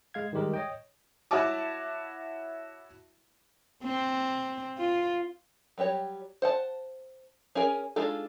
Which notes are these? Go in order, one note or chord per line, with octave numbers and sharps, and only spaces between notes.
G#3 F5 G#6
D#3 G3 G#3 G4 A#4
C#5 D#5 G5
E4 F#4 C#5 E5 A5 D6
C4
F4
F#3 G3 G4 C#5
C5 F#5 A5
C#4 G#4 A#4 G#5
G#3 D4 D#4 F4 A4